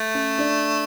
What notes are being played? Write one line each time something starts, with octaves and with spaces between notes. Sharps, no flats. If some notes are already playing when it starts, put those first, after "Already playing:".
Already playing: A3
C#4
D4